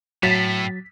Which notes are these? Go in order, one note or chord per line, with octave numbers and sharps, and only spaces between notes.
A2 F#3 A6 B6